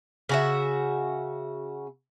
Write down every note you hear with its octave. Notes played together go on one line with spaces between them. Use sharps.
C#3 F#4 E5